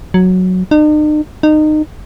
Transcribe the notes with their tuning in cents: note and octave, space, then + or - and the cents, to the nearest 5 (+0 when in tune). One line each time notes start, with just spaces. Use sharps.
F#3 -5
D#4 -45
D#4 -25